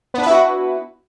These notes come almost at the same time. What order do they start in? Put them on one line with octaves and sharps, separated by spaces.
B3 D4 B4 E4 F#4